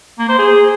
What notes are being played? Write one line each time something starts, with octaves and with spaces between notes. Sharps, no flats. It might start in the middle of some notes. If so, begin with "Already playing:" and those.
A#3
C5
G#4